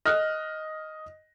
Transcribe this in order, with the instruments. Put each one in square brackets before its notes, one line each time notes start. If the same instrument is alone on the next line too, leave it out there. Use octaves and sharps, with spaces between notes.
[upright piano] D#5 F6 F#6